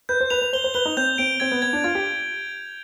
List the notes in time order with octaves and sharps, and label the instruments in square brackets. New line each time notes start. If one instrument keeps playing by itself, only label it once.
[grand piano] B4 [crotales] G6
[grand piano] C5
[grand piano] B4 [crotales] F7
[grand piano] B4
[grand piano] C5 [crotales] G7
[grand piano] C5
[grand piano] B4 [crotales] G7
[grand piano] D#4
[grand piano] C4 [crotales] G6
[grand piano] C4 [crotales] D7
[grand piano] C4 [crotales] G#6
[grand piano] B3
[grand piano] B3 [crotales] G#6
[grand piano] D4
[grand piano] F4 [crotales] G#6
[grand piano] G4